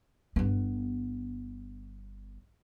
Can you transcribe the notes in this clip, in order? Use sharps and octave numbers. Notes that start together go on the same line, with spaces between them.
G1 B3